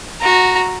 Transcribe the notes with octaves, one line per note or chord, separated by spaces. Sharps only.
F#4 A#5